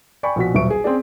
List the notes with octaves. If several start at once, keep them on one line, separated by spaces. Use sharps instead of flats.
D5 G5 G#5 B5 C#6
A#1 B2 F#4 B6
D#1 B1 E5 C#6 D7
G#4
C4 C#4 G#4 D5